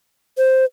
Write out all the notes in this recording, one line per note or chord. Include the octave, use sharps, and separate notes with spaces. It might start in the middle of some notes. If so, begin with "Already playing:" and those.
C5